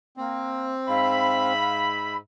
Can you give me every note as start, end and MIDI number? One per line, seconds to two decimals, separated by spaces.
0.17 0.72 58
0.17 1.53 60
0.88 2.17 44
0.88 2.17 76
0.88 1.84 77
0.88 2.17 83